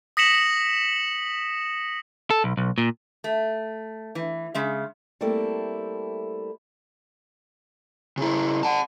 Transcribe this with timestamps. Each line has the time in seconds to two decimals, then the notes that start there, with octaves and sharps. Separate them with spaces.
0.17 D#6 A#6 B6 C#7 E7 F#7
2.31 A4
2.44 B1
2.57 B1
2.78 A#2
3.24 A3
4.15 E3
4.54 C#3 G#3 E5
5.21 G3 A3 A#3 C4 E4 A4
8.17 C#3 E4
8.63 F#5 A5